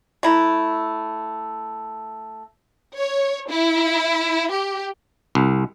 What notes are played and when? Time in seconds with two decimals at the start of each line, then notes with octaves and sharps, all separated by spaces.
0.23 A3 E4 A#5
2.96 C#5
3.50 E4
4.52 G4
5.35 C2